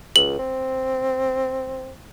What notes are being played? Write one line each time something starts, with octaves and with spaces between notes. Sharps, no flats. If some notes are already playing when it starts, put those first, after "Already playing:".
C#2 F#7
C4